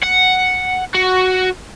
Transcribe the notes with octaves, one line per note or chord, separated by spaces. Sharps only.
F#5
F#4